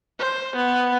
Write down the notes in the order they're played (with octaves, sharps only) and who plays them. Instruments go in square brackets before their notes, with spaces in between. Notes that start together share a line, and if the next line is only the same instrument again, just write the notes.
[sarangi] C5
B3